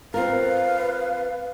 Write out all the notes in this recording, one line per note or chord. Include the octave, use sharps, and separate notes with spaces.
C4 F4 A#4 B4 F5